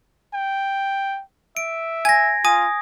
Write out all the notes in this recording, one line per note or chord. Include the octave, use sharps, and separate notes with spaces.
G5
E5 D7
G#5 G#6 A#6
F4 G#5 D#6